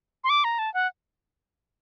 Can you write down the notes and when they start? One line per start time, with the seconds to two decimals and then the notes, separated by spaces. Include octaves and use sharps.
0.24 C6
0.30 D6
0.44 A#5
0.59 A5
0.74 F#5